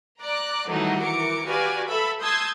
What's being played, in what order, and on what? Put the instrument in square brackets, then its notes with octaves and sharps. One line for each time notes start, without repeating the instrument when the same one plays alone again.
[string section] D5 A#5 D6 F#6
D#3 E3 F#3 G3 A3 D#4
E3 A#4 D6 C#7
F#4 G4 B4 D5 F5 G#5
A4 E5 B5 E6
A5 C6 D#6 E6 G6 G#6